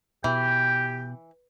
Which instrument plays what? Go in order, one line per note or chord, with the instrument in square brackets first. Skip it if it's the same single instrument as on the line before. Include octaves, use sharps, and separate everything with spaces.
[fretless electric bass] B2 [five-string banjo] E3 [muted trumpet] G4 [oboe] G5